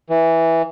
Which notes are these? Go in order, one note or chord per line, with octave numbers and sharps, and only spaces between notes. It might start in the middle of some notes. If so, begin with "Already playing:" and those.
E3